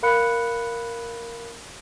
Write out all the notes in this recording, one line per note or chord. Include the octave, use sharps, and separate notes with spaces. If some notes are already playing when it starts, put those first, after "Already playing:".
A#4 F5 B5 F#6 C#7